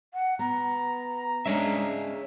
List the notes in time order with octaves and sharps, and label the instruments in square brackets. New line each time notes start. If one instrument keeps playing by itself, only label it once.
[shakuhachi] F#5
[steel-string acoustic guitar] B3 [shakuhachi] A#5
[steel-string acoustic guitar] G#3 C#4 D4 [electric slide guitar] G#4 C#5 E5